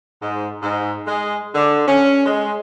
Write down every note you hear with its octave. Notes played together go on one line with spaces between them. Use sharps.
G#2
G#2
G#3
D3
C#4
G#3